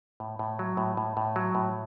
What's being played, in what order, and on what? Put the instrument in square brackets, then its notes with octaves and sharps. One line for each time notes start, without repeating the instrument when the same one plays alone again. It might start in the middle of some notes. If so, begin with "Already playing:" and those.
[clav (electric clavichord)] A2
A2
F#3
A2
A2
A2
F#3
A2